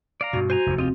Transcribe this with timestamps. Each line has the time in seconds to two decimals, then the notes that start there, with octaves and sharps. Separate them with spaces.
0.21 D5 F5 A#5
0.33 G2 B2 F#4
0.50 F#4 C5 G#5 A#5
0.66 F1 D#2
0.79 C4 F4 G4 D#5